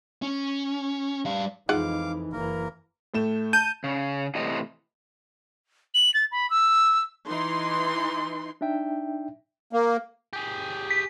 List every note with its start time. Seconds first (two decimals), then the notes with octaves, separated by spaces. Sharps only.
0.22 C#4
1.25 G3 F5
1.69 F2 E3 G#3 D#4 F4 F5 F#5 D6
2.33 F#1 E3 A#3 A#4
3.14 A2 A3 E7
3.53 A5 G6 D#7
3.84 C#3
4.35 A2 C3 E3 D#5
5.94 F#7
6.14 A6
6.32 B5
6.50 E6
7.26 E3 D#4 C6
8.61 D4 D#4 E5 G5
9.73 A#3
10.33 G4 G#4
10.90 B6